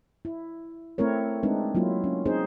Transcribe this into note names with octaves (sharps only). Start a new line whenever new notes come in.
E4
A3 C4 E4 A#4 C#5
G#3 C4 D4 D#4 B4
F#3 A#3 E4 F4
C#4
C4 D#4 G#4 C5